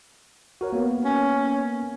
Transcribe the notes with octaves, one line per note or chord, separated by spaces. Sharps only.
F#4 A#4 C#5
A#3 B3
C#4